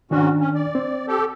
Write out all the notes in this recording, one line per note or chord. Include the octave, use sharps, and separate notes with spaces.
G#2 D#3 C#4 D4 F#4
C#4
D5
C4
G4 A4